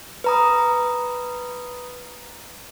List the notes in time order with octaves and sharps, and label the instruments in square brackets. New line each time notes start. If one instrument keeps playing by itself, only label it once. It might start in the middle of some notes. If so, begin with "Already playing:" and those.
[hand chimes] B4 A#5 D#6